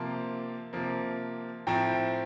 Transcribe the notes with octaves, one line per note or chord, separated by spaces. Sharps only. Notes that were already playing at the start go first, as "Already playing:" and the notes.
Already playing: C3 F3 A#3 A5 C6
C3 F3 A#3
A2 F3 C4 E4 G5 A#5